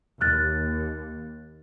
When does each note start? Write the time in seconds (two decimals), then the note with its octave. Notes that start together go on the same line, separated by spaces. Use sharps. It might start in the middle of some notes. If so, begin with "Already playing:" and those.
0.21 D#2 F6 F#6 A6